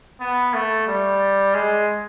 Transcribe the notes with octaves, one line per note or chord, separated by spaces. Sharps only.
B3
A3
G3
G#3